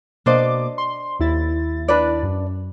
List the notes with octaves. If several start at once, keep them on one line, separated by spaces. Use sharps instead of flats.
B2 A#3 D4 C5 D#5 D6
C6
D#2 E4 A6
D4 B4 D5
F#2